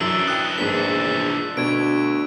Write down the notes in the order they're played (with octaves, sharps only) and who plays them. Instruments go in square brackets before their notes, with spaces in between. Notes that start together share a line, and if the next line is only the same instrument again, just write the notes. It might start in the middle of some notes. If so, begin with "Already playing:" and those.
[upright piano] F#2 F#3 E4 [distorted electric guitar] E3 D4 [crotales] E6
[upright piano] G5 D#6 [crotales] F#6
[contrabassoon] A#1 [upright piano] G#2 B3 [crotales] B6
[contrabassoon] D2 [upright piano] B2 [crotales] G#6 D7